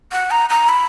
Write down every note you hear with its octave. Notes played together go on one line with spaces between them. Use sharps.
F#5
A#5
A#5
B5